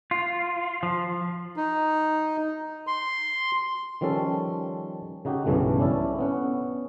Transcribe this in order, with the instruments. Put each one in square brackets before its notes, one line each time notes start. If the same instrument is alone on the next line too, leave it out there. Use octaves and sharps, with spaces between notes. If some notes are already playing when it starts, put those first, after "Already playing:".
[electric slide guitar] F4
F3
[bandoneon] D#4
C6
[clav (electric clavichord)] D#3 F3 G3 C#4 A4
C#3 D#4 F#4 G4
B1 G2 C#3 E3 A3
C#4 D4 E4 A4
B3 C#4 F#5